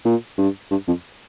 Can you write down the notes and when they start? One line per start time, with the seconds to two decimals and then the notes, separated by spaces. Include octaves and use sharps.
0.05 A#2
0.38 G2
0.71 G2
0.87 F2